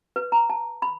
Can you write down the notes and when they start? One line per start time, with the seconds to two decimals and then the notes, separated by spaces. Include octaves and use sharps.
0.16 B4
0.32 A#5
0.50 A5
0.82 B5